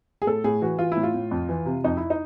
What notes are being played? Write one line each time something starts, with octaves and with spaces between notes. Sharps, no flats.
G#4
A2 A4
A2 G#4
E3 F#4
E3 F4
E4
A2
F4
A2
F2
E3
C3
F2 D#4
E4
D#4